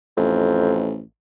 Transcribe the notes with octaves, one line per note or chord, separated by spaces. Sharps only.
A1 F2